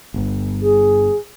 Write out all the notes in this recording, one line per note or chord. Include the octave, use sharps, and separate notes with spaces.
G1
G#4